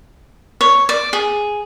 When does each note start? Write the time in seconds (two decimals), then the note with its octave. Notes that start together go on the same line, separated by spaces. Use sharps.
0.61 C#5
0.89 D5
1.13 G#4